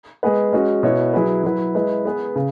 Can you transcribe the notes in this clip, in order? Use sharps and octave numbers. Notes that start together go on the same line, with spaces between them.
G#3 B3 G#4 B4
G#3 C#4 F#4
B2 B3 E4 C#5
F#3 E4 G#4 B4
F#3 E4 B4
G#3 E4 B4
B3 G#4 B4
C#3